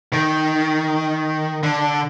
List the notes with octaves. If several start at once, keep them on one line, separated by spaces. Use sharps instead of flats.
D#3
D3